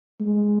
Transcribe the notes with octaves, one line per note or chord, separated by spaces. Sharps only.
G#3